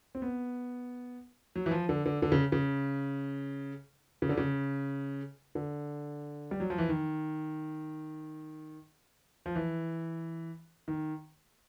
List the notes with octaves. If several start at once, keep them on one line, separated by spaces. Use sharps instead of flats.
C4
B3
F#3
E3
F3
D3
D3
D3
C#3
C#3
C#3
D3
C#3
D3
G3
F#3
F3
E3
D#3
F3
E3
D#3